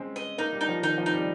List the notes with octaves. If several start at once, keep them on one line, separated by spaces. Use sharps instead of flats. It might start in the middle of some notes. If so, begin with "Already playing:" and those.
Already playing: G#3 C4 C#4
D#5
A#3 D#4
G3
D#4
F3
D#3 D#4
F3
D#4
G3